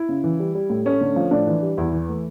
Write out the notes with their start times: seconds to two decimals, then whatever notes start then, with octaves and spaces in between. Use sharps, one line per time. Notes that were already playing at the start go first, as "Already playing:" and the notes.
Already playing: E4
0.09 C#3
0.24 E3
0.40 G3
0.55 G3
0.70 A2
0.86 A3 C#4
1.01 D3
1.16 F3
1.31 A2 D4
1.47 E3
1.62 G3
1.77 E2 E4
1.93 E3
2.09 A3